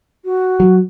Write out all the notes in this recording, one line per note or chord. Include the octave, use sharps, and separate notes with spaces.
F#4
F#3